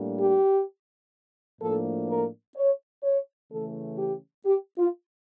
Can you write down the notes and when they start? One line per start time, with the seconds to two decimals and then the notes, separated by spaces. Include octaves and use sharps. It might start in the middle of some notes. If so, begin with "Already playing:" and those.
Already playing: A2 G3 A#3 D4
0.18 G4
1.61 A2 F3 A#3 D4 A4
2.09 A#4
2.56 C#5
3.03 C#5
3.51 C#3 E3 A3 C#4 A4
3.98 G4
4.46 G4
4.78 F4